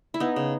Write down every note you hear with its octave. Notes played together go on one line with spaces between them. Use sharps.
E4
B3 D#4
C#3